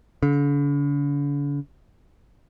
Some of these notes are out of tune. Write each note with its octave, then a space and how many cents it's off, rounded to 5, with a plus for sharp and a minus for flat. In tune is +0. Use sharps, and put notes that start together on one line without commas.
D3 -45